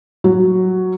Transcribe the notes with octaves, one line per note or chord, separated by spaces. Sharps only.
F#3